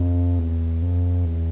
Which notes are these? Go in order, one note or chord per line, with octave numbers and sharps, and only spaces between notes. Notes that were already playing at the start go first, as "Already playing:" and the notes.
Already playing: F2
E2
F2
E2